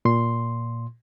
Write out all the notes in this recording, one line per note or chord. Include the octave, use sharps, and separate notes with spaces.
A#2 C6